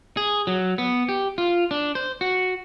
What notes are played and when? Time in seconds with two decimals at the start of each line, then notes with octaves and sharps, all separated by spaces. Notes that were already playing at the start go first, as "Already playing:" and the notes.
0.17 G#4
0.47 F#3
0.78 B3
1.09 G4
1.38 F4
1.71 D4
1.95 C5
2.21 F#4